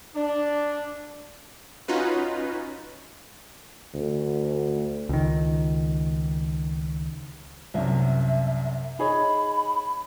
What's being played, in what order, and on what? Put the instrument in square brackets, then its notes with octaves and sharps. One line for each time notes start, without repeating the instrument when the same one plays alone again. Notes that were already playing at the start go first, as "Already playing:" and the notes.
[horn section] D4
[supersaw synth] C#4 D#4 F4 F#4 B4
[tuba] D2
[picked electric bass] C#2 D#3
[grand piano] C2 F#2 C3 [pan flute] E5
[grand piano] D#4 G#4 C#5 [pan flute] B5